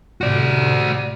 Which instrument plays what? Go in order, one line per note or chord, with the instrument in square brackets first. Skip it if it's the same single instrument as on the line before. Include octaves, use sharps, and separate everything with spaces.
[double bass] A2 C3 [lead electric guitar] F#4 D5